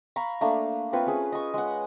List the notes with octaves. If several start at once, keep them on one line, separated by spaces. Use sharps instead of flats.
F5 A#5 B5 C#6
A3 A#3 D4
C4 F4 B4 C#5
C#4 G#4
D#5 C#6
G#3 F#5